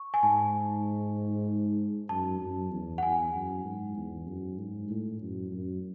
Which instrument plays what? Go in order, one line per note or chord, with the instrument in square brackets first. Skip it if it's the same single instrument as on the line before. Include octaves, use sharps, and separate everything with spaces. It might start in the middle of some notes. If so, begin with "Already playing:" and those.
Already playing: [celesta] C#6
G#5
[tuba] G#2 [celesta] A5
[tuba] F#2 [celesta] A5
[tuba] F#2
E2
[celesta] F#5
[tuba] E2 [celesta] G#5
[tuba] F#2
G#2
E2
F#2
G#2
A2
F#2
F#2